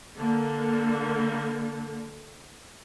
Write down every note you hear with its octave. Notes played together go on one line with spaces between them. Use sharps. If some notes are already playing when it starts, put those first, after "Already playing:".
D3 A#3